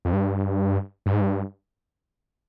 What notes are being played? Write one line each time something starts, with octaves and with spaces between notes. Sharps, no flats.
F2
G2
G2
G#2
G2